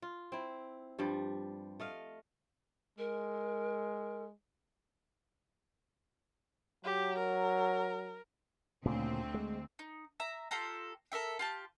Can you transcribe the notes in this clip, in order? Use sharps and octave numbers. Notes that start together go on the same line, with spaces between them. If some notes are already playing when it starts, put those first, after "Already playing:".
F4
C4 E4
G2 F3 G3
A3 D#5 F5
G#3 A#4
F#3 G4
A#4
D2 A#2 C#3 C4
G#3
D#4
E5 A#5
F4 G4 A4 A#5
A4 A#4 E5 G5
F4 G4 A5